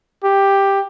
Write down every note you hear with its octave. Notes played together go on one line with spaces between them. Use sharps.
G4